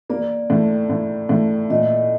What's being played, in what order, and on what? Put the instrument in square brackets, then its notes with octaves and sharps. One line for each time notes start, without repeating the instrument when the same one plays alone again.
[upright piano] A#3 [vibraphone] D5
[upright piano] A2
A2
A2
[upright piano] A#2 [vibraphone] D#5